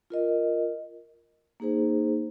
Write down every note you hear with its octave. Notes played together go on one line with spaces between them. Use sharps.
F4 A#4 D#5
A#3 D#4 G#4 C5